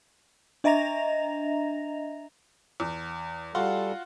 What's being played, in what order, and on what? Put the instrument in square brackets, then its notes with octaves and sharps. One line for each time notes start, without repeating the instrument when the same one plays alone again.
[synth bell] D4 D#5 E5 A#5 A#6 F7
[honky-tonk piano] E2
[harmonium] G3 A4 [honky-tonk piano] F4 F#4 C6